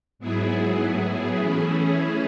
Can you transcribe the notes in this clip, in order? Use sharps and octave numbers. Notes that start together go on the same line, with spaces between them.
G#2 F#3 B3 E4 G#4
A2 F#3 B3 E4 G#4
E3 A3 C#4 E4 G#4